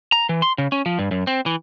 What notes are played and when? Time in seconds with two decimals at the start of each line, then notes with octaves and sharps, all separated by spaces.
0.12 A#5
0.29 E3
0.42 C6
0.58 C#3
0.72 C#4
0.86 F3
0.99 G2
1.11 F#2
1.27 C4
1.46 E3